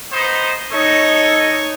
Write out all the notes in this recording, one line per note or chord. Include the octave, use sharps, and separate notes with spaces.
B3 D#4 C5
D#4 A4 C#5 D#5